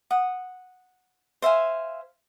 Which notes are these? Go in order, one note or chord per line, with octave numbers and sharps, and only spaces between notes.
F#5 D#6
C5 E5 F5 G#5